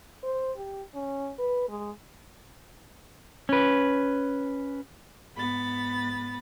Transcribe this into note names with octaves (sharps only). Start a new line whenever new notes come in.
C5
G4
C#4
B4
G#3
C#4 B4
G#2 B3 B5 A6